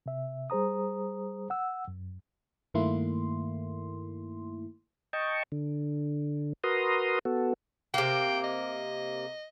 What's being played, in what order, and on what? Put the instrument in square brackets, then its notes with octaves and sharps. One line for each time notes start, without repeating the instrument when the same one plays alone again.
[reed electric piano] C3 E5
G3 G#4 C5 A#5 D#6
F#5 E6
F#2
[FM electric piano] G2 D#3 A3 A#3 E4 C6
[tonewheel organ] D#5 G5 A5 C#6
D3
F#4 A#4 B4 A#5 C6 D#6
B3 F#4 A4
[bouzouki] C3 A#3 [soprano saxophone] G5
[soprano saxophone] D#5